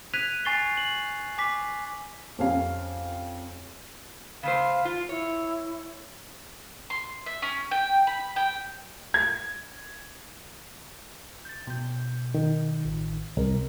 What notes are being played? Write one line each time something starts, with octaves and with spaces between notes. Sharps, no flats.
F#6 G#6 B6 D#7 F7
G#5 C#6 A6 C7 G7
F#7
G#5 D6 B6
F2 C#4 G4 F5
C#3 A3 C5 F5
F4
E4 C#5
C6
E5
C#4
G5
B5
G5
G#6
G6 A6
B2 G6
D#3
A1
C2 A#4